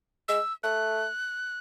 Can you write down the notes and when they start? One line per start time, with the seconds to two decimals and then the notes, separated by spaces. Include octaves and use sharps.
0.28 G#3 E6
0.63 A3 F#6